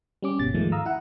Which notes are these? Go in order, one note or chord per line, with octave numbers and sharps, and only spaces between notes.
G3 C#4 D6
G1 B2 A6
E2 G#2 D#3 F3 G#3 A3
F5 A#5 D#6 E6
E4 F#5